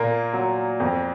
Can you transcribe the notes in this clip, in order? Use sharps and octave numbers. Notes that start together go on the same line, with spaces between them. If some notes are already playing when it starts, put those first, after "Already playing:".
Already playing: A#2 A#3
F#3
F2